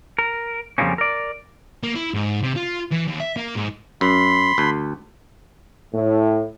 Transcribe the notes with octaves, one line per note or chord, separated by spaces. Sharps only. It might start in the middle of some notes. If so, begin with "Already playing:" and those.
A#4
F2 C#3 F3 G3 A#3 C#4
A#4 D5
A#3
E4
G#2
C3
F4
E3
D#2
E5
A#3
G#2
F#2 B5 C6
D2
A2